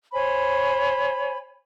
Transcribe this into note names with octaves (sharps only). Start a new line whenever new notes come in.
C5 C#5 G#5 B5